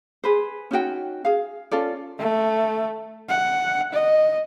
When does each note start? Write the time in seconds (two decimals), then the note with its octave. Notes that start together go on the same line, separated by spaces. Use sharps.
0.24 G#4 B4 C5
0.71 C#4 D#4 F#4 G5
1.25 G#4 F5
1.71 C#4 F4 A4 D5
2.19 A3
3.29 F#5
3.93 D#5